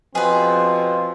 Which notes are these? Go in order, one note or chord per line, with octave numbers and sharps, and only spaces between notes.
B2 F3 C4 G#4 B4